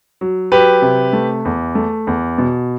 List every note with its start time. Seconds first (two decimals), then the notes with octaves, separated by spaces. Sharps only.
0.21 F#3
0.52 F#3 G4 B4
0.82 C3
1.13 A3
1.45 E2
1.75 A3
2.07 E2
2.38 B2